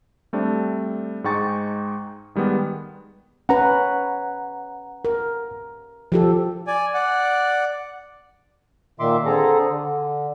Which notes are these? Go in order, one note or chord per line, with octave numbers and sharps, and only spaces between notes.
G3 A3 C4 D4
G#2 G#3 D#4 G5 C#6 A6
D#3 G3 G#3 B3
C#4 B4 F#5 A#5
A#4
F3 G4 A4
D5 G#5
D5 F#5
A#2 D#3 E5 C6 D6
D3 C4 G#4 A4 A#5
D3